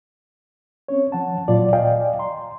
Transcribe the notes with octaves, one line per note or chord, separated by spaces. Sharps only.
C4 C#4 C#5
F3 F#5 A5
A#2 F#3 F4 D5
D5 D#5 F5 G5 G#5
A#5 C6